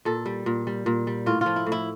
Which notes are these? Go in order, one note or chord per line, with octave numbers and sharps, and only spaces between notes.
A#2 A4
G3
A#2
G3
A#2
G3
A2 F4
F4
F3
E4
A2
E4